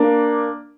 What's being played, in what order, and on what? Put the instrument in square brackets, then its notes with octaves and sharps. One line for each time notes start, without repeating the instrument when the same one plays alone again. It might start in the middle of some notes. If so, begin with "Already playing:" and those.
Already playing: [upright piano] A#3 D4